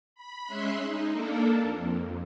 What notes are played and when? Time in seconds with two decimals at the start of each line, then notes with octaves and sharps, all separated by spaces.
0.15 B5
0.47 G#3 C#4 E5 C6 F#6
0.80 D#4
1.13 A#3 D4 A4 A#4
1.63 F2